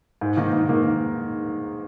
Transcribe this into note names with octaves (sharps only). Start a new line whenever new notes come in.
G#2
D#3 A#3
G#2
D#3 A#3